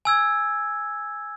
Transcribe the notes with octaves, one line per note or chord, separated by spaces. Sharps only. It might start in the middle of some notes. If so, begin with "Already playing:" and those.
G#5 E6 G#6